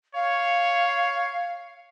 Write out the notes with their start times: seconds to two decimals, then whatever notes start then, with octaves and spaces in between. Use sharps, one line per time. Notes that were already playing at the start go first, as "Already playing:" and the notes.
0.14 C#5 F5